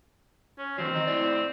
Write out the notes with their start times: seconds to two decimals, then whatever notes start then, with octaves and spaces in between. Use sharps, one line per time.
0.58 C#4
0.78 D3 E3 F#3 C4
0.92 D#3 D#5
1.07 A2 E4 D5